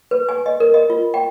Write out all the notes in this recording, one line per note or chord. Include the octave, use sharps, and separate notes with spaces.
B4
G#5
D#5
A#4
D#5
F4
G5